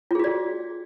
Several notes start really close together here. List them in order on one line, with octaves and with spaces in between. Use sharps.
F4 G#4 F#4 D5